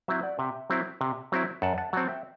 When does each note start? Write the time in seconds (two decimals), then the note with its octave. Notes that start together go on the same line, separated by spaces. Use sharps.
0.08 F#3 C4 E4 C5 E5
0.23 D5 F#5
0.39 C3 E5 G5
0.70 F#3 C4 E4
1.01 C3
1.32 F#3 C4 E4
1.62 F#2 F#5 A5
1.78 F#5 A5
1.93 F#3 C4 F#5 A5
2.08 E5 G5